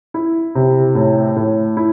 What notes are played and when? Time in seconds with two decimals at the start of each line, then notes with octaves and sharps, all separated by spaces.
0.14 E4
0.55 C3
0.95 A2
1.36 A2
1.77 E4